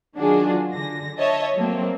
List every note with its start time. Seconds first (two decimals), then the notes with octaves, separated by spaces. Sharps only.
0.17 D#3 F#3 D4 F4 F#4 G#4
0.73 D3 A#6
1.19 C#5 D#5 E5 A5
1.55 F#3 A3 A#3 C4